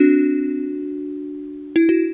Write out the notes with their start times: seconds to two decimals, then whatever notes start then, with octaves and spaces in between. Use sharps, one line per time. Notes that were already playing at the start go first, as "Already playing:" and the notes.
Already playing: C4 D4 F#4
1.76 E4
1.89 F#4